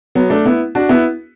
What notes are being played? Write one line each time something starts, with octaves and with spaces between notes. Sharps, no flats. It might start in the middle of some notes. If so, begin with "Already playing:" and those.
F#3 B3
A3 D4
B3 E4
D4 F#4
B3 E4